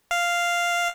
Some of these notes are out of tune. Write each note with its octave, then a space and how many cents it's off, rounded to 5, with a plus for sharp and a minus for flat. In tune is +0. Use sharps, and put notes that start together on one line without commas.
F5 -5